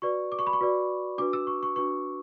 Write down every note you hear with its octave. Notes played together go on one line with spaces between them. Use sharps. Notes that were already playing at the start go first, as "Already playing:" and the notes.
F#4 B4 D5 C#6
D6
C#6
B5
C#6
F#4 B4 D5
D4 F#4 B4 D6
E6
C#6
C#6
D4 F#4 B4 C#6